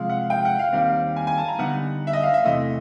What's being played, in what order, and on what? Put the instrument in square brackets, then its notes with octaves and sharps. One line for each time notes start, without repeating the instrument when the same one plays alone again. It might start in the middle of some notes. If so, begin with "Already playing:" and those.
Already playing: [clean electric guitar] C3 F3 G#3 [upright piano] F5
[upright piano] F#5
G5
F#5
F5
[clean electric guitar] D#2 D#3 G3 C4 [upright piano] F5
[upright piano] G#5
G#5
A5
A#5
[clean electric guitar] D3 G3 B3 D#4 [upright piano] F#5
[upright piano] E5
D#5
F5
E5
[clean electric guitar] E2 C3 E3 A3 [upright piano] D#5